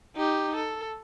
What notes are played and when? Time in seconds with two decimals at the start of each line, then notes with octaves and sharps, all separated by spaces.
0.16 D#4 G4
0.56 A4